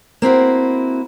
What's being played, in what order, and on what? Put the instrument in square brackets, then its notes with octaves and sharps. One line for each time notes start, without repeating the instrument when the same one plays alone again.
[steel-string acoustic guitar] A#3 C4 E4 F#4